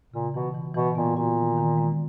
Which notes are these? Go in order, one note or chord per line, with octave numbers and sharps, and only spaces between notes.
A#2 C#3
B2 E3
E3
B2 E3
A#2 B3
A#2 F#4
D#3
D#3
G#3